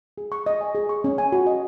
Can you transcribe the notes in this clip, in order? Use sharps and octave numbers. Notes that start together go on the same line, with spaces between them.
G#4
C#6
D#5
G#5
G#4
C#6
C#4
G#5
F#4
D#5